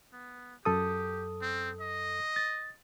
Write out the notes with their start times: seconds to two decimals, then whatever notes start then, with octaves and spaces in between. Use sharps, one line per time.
0.13 B3
0.65 F#2 G4 A4 D#6
1.42 C4
1.81 D#5
2.36 A6